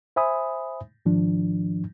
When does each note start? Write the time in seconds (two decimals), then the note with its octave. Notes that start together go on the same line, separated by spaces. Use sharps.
0.16 C5 E5 G#5 B5 D#6
1.06 G#2 D#3 F3 D4